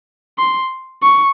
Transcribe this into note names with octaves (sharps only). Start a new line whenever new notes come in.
C6
C#6